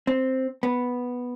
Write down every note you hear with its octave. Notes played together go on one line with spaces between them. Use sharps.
C4
B3